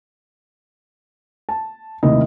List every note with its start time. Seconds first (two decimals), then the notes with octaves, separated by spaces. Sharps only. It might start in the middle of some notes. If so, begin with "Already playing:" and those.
1.49 A5
2.03 A1 D#2 C3 E4 D#5